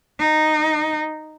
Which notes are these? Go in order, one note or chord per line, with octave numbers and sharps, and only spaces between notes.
D#4